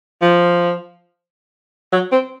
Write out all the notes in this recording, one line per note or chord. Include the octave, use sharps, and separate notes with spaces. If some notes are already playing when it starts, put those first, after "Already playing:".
F3
F#3
C4